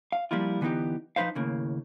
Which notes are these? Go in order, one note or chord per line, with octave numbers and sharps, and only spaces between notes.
F5
F3 G3 A#3 E4 F4
D3 E3 B3 D4 D#4 G4
F3 D#4 B4 C5 F5
D#2 A2 C#3 A#3